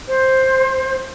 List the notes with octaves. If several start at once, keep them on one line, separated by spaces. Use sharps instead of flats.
C5